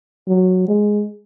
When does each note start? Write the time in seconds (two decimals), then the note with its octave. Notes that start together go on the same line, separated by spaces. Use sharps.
0.28 F#3
0.68 G#3